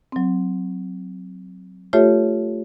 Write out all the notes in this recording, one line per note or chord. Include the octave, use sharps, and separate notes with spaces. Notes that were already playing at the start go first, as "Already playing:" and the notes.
F#3 C4
A3 F4 G4 A4 C#5 E5